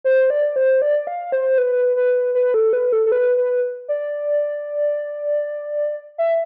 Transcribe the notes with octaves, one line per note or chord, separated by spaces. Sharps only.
C5
D5
C5
D5
F5
C5
B4
B4
B4
A4
B4
A4
A4
B4
B4
D5
E5